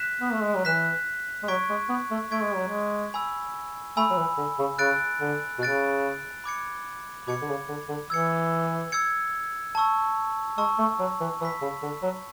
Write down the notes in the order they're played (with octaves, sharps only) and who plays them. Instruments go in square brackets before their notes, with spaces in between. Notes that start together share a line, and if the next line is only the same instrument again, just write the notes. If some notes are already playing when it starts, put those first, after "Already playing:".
Already playing: [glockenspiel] F#6 B6 E7
[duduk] B3
A3
G#3
F#3
[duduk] E3 [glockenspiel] F#6 B6 E7
[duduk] G#3
[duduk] F#3 [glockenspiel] C#6 G#6 B6 D7
[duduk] G#3
B3
A3
[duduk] A3 [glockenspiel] C#6 G#6 B6 D7
[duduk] G#3
F#3
G#3
[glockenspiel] G#5 B5 E6
[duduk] A3 [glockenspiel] G#5 B5 E6
[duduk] F#3
E3
D3
C#3
[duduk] C#3 [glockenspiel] F#6 A6 D7
[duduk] D3
B2
[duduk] C#3 [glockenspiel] F#6 A6 D7
[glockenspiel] B5 D6 G#6 C#7
[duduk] B2 [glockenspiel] B5 D6 G#6 C#7
[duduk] D3
C#3
D3
D3
[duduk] E3 [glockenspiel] E6 G#6 C#7
[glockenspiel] E6 G#6 C#7
A5 C#6 E6
[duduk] G#3 [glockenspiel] A5 C#6 E6
[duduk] A3
F#3
E3
[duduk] E3 [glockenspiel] B5 E6 B6
[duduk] C#3
D3
F#3